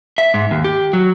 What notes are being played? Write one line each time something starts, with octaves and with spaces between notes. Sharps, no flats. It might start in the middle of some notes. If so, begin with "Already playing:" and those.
E5
G#2
D#2
G4
F#3